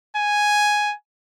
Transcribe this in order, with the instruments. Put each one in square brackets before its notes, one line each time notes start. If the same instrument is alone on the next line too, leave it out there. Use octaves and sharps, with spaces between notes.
[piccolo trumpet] G#5